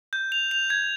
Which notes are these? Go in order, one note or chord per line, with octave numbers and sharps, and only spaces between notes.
G6
F7
F7
G#6